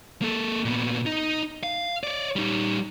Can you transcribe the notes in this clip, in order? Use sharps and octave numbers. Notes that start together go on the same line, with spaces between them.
A#3 A4
A#2 B3
D#4
F5
C#5 D5
G3 D#4